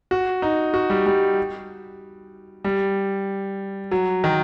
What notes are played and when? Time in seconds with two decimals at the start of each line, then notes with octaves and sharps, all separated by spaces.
0.11 F#4
0.42 D#4
0.74 F#4
0.90 G3
1.06 G3
2.64 G3
3.91 F#3
4.24 D#3